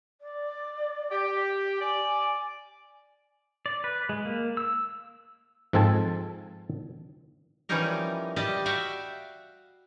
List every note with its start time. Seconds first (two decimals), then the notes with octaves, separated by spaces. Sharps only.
0.21 D5
1.11 G4
1.81 D5 G#5
3.66 D5
3.84 B4
4.09 G#3
4.25 A#3
4.57 E6
5.73 G#2 F3 C4 A4 G#5 A5
7.69 E3 F3 G3 C#4 D#4 A#4
8.36 G3 G4 D5 D#5 A5
8.66 F#4 E5 F5 G5